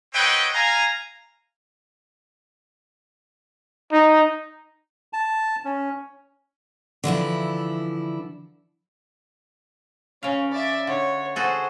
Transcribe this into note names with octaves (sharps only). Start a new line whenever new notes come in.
C4 B4 C#5 D#5 F#5 G5
F5 G#5 A#5
D#4
A5
C#4
D3 E3 F3 E4
C#3 C#4 F5
D5 E5
D3 C#5
F#4 G#4 A4 C5